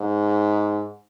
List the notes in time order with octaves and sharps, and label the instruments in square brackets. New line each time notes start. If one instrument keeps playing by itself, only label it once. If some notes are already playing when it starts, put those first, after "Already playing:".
Already playing: [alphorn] G#2